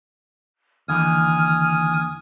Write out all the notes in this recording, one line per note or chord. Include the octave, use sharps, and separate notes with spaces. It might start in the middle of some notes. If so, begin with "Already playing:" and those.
D#2 D3 E3 G#5 D#6 F6